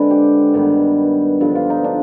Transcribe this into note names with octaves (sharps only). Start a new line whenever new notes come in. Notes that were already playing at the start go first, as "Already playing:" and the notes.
Already playing: D3 G#3 C4 B4
G4
G2 D#3 B3
G2 D3 F3
F4
D#4
D4